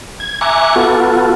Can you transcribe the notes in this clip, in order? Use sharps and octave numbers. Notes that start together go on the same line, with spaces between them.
G#6
E5 G#5 A#5 C#6 D6 F#6
B3 F4 F#4 A4